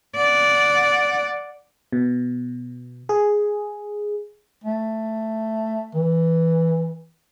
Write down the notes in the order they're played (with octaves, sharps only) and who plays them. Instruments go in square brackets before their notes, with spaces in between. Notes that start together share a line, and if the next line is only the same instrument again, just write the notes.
[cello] D5 F#5
[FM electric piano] B2
G#4
[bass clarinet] A3
E3